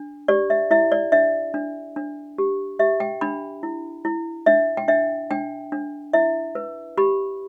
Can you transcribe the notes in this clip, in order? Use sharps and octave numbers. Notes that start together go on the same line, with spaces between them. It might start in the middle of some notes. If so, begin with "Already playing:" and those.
Already playing: D4
G4 D5
E5
E4 E5
D5
D4 E5
D4
D4
G4
G4 E5
G5
D4 B5
E4
E4
D4 E5
G5
D4 E5
D4 G5
D4
E4 E5
B4
G4 B5